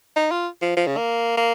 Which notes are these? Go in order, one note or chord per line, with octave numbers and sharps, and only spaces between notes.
D#4
F4
F3
F3
C#3
A#3
A#3